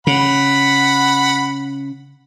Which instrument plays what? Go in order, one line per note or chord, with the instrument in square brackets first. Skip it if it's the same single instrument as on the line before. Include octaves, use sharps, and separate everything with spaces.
[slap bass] C#3 [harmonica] F#5 B5